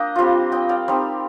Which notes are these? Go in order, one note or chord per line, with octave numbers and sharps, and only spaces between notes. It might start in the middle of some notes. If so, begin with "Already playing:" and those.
Already playing: A#3 D4 D#5 F5 G5
G3 C4 F4
D#5 G5
D5 F5
G3 C4 D#4